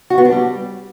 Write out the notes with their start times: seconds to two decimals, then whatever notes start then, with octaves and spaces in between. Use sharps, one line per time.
0.10 F#4
0.18 B3
0.25 D4
0.32 G3